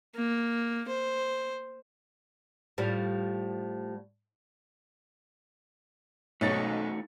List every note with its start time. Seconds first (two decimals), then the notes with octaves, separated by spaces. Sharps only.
0.15 A#3
0.88 C5
2.78 A2 F3 G3
6.41 B1 A3 D#4 F#4 C#5 A6